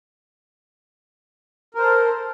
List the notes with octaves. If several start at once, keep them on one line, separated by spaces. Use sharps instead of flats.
A4 A#4 C5